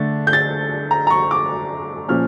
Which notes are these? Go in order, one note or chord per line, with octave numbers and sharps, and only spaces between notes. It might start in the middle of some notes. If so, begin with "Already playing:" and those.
Already playing: D3 A3 D4 A6
G6
A6
A#5
A#5
C#6
D6
A#2 F3 C#4 F6